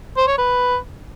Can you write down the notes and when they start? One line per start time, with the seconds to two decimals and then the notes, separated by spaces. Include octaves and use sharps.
0.17 C5
0.28 C#5
0.38 B4